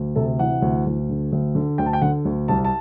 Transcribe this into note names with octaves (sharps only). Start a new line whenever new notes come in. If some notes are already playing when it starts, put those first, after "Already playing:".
Already playing: D2
C3 A4
E3 F#5
D2
D2
D3
D2
D3
D2 G5
A5
G5
D3 F#5
D2
C2 A5
A5